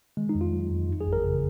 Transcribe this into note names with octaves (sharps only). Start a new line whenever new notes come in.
D#3 G#3
D#4
F2
F4
F#3
F2
F#2
G#4
G#1
A#4
C#3